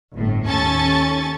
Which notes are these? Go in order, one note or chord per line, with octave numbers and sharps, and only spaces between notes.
G1 A2
D#2 C#4 A4 G#5 C#6 A6